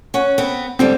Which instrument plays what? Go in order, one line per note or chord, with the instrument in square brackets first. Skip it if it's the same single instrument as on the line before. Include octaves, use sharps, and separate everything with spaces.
[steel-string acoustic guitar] C#4 F#5
B3 C4
[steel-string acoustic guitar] G#2 D3 G3 [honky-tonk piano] C4